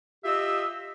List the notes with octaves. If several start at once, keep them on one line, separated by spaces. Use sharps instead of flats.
F4 G4 D#5 E5 E6